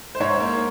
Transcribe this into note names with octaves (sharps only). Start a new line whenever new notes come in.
C5
G#2 C#5
A#3